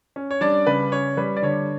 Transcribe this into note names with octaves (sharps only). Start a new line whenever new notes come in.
C#4
C#5
G3 D4 D5
C#3 B4
C#4 C#5
G3 B4
D5
D3 C#5